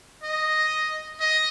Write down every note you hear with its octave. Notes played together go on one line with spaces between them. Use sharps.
D#5
D#5